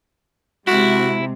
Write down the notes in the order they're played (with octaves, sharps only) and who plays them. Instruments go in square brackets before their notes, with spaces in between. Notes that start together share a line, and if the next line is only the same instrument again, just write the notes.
[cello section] C3 G#3 [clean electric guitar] E4 [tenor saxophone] F#4